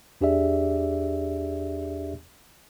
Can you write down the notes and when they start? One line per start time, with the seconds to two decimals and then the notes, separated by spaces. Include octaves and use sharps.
0.21 E2 D4 G4 G#4 D5 E5